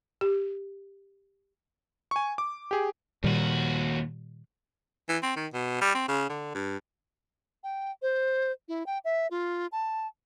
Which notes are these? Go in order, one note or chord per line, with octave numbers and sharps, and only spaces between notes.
G4
G#5 C#6
D6
G4 G#4
D#2 A#2 D#3 G3 F#4
E3
C4
D#3
B2
G3
C4
C#3
D3
G2
G5
C5
E4
G5
E5
F4
A5